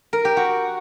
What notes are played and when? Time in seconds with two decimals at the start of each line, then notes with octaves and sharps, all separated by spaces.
0.13 A#4
0.25 G4
0.37 F#4